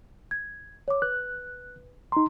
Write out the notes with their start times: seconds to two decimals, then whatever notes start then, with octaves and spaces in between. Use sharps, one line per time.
0.31 G#6
0.88 C#5 D6
1.02 B4 F#6
2.12 D#4 A#5 C6